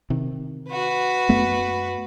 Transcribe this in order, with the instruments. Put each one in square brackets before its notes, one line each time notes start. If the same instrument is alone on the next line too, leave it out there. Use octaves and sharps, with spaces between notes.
[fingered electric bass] C3 D#3
[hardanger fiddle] F#4 B4
[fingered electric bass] F#2 A3 B3